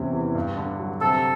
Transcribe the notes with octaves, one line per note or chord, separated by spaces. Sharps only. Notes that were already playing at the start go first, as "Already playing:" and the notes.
Already playing: E2 C3 C#4
E3
G2
D3
F#3
C3 A4